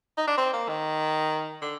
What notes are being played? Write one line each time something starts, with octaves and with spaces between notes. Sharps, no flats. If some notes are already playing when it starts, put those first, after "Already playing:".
D#4
D4
C4
A#3
D#3
D3